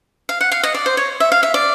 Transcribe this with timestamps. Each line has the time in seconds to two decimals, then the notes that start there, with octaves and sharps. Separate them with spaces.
0.29 F5
0.41 F#5
0.52 F5
0.63 D#5
0.74 D5
0.86 C5
0.97 C#5
1.20 E5
1.32 F5
1.43 E5
1.54 D5